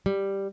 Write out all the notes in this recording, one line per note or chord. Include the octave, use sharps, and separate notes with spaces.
G3